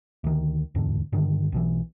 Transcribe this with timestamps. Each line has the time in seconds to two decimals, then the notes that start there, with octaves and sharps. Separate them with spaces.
0.24 D2 D#3
0.75 D1 E2 G#2 D3
1.13 G2 D3 D#3
1.52 B1 B2 E3